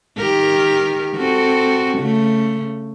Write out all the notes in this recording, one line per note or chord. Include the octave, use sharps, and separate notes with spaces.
D#3 G4 A#4
C4 F#4 A4
C#3 A3